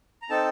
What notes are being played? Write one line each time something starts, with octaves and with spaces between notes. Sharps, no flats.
A#5
C4 D#4 A4 A5